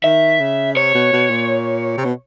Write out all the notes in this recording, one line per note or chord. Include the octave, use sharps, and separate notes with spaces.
D#3 E5
C#3
C3 C#5
B2
B2
A#2
C3
B2